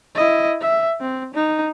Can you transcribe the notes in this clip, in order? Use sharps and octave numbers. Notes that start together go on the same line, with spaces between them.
E4 D#5
E5
C4
D#4